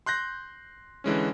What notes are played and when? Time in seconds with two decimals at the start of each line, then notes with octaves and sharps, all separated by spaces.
0.06 C6 F#6 G6 A#6
1.04 D3 E3 G#3 C#4